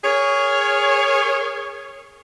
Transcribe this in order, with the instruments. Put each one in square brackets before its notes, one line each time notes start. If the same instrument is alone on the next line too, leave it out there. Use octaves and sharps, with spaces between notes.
[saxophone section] G#4 A#4 C#5